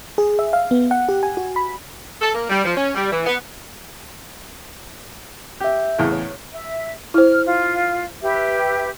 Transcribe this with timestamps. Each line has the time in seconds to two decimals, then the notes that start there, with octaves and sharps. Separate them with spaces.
0.18 G#4
0.39 E5
0.53 F5
0.71 B3
0.91 F#5
1.09 G4
1.23 G#5
1.37 F#4
1.56 B5
2.21 A4
2.34 A#3
2.50 G3
2.65 F3
2.76 C#4
2.95 G3
3.12 E3
3.26 B3
5.60 G4 E5 G6
5.98 E2 A2 C#3
6.12 C#5
6.52 E5
7.14 E4 C5 F6
7.45 F4
8.22 G4 B4 E5